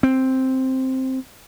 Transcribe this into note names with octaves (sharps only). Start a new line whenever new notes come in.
C4